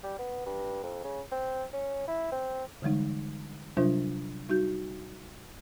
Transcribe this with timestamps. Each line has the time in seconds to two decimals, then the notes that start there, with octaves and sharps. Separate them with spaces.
0.03 G3
0.19 B3
0.46 G2
0.83 F2
1.04 C#3
1.31 C4
1.73 C#4
2.08 E4
2.32 C4
2.82 D3 E3 G3 G#3 D#4
3.77 C3 F#3 G3 D4 F4 C5
4.49 G3 D#4 F#4 G6